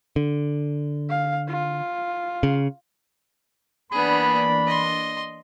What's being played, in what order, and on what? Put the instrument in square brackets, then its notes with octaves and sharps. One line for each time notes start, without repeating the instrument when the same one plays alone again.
[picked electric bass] D3
[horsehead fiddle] F5
F4
[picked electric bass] C#3
[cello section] E3 A#3 D4 [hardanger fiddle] B3 G#4 [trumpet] B5
[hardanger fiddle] D#5 C6